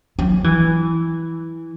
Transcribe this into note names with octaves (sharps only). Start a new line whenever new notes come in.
F#3
E3